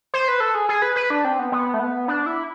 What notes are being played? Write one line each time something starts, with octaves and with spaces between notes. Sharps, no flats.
C5
B4
A4
G#4
G#4
B4
B4
D4
C4
B3
B3
A3
B3
D4
E4